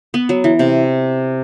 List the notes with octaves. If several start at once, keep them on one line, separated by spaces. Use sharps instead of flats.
B3
F#3
E3
C3